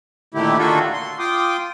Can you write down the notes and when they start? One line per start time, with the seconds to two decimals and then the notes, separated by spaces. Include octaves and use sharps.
0.34 A#2 D3 D#3 A3 E4 G4
0.58 D#3 A#3 D4 F4 F#4 A4
0.93 C6
1.19 F4 G5 C6 D6 D#6